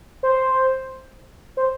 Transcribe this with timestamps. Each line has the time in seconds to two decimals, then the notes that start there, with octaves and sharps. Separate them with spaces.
0.23 C5
1.57 C5